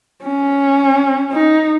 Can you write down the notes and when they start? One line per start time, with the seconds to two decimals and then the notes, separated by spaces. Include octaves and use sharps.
0.23 C#4
1.32 D#4